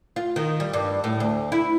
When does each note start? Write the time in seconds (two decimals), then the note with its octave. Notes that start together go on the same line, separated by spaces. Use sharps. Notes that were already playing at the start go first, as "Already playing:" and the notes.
0.16 F4
0.36 D#3
0.60 G3
0.73 G2
1.04 A2
1.20 D2
1.52 E4